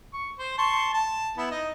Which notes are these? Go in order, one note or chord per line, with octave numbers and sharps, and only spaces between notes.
C#6
C5
A5 C6 C#6
A5
B3 E4
D#4 D#5